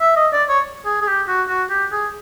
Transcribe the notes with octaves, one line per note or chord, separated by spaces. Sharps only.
E5
D#5
D5
C#5
G#4
G#4
G4
F#4
F#4
G4
G#4